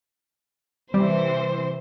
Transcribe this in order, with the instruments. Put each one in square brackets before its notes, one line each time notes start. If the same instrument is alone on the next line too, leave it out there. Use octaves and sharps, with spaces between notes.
[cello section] C3 E3 [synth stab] G3 [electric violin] C5